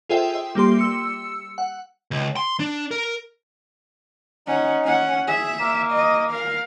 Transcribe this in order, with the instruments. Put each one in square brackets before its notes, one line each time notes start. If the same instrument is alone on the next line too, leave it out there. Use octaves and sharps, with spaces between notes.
[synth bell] F4 G#4 A4 C5 E5 G5
E5
G3 A#3 G4 C6
E6 C#7
F#5
[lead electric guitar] C#2
C6
D4
A#4
[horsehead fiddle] C#4 F#5 [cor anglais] D#4
[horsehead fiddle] C#4 F#5
[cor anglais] G#4 [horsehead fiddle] E5
[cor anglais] A#3
[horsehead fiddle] D#5
A#4 F5